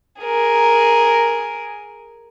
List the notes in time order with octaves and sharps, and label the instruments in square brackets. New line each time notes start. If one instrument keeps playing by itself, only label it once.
[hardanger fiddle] G#4 A#4